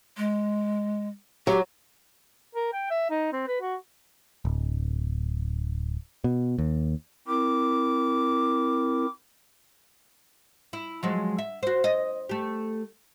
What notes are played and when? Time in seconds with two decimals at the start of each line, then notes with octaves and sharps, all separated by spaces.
0.17 G#3
1.47 F#3 G4
2.55 A#4
2.73 G5
2.91 E5
3.10 D#4
3.33 C4
3.48 B4
3.62 F#4
4.45 D1
6.24 B2
6.58 D#2
7.28 C4 E4 A#4 D6
10.73 E4
11.03 F3 F#3 G#3
11.38 E5
11.63 F#4 C5
11.84 D#5
12.29 A3 G4